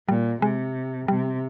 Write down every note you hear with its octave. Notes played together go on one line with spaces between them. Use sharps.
A#2 G3
C3 G#3
C3 G3